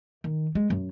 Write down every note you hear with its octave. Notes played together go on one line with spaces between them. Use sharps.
D#3
G#3
F#2